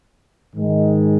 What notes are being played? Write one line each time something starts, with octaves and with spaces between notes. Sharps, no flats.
G#2 D#3 G#3